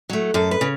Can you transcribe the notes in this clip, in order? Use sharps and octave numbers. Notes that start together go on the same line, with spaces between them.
F#3 A3
F#2 A4
B4
C#3